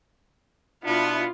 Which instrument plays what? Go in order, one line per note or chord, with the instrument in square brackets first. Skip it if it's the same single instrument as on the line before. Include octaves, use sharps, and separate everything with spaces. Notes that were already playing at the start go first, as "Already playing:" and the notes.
[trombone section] B2 D4 [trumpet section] B3 [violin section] E4 F4